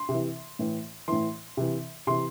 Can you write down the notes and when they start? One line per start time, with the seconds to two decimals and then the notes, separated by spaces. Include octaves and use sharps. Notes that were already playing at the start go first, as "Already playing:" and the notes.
Already playing: C6
0.09 C3
0.14 E3
0.59 A2 E3
1.08 A2 E3 C6
1.57 C3 E3
2.07 C3 E3 C6